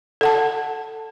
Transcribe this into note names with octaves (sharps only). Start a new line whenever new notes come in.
A4 F#5 A5